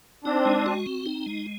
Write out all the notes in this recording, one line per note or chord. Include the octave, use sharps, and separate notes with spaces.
C4 D4 D#4
G#3
F#4
C4
D#4
G#3